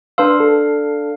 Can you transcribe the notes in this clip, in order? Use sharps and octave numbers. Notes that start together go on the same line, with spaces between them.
D4 B4 F5 C6 E6
A4